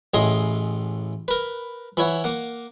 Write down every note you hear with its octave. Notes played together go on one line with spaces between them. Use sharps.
A1 A2 G#4 D#5 C6
A#4 B4
E3 E4 C#5 F#5
A#3 F#5